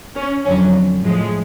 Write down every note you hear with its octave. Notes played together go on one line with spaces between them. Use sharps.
C#4
F2 D3 F#3 C#4
A2 F3 G#3